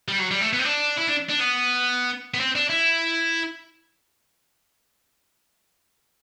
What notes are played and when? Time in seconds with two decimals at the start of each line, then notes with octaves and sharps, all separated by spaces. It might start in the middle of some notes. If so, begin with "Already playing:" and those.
0.08 G3
0.19 F#3
0.31 G3
0.41 A3
0.53 B3
0.59 C4
0.64 D4
0.97 E4
1.08 D4
1.30 D4
1.40 B3
2.34 B3
2.40 C4
2.56 D4
2.70 E4